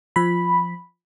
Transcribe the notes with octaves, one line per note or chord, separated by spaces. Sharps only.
F3 B5